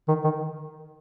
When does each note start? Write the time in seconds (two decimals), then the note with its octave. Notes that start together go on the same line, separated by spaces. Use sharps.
0.08 D#3
0.24 D#3